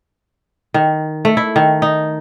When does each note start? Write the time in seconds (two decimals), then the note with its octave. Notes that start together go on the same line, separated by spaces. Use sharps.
0.74 D#3
1.25 A3
1.37 E4
1.56 D#3
1.82 D#4